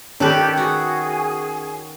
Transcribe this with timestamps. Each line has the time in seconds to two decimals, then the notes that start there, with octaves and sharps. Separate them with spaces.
0.20 D#3 C#4 G4 A4 B4 D5
0.57 F#4 G#4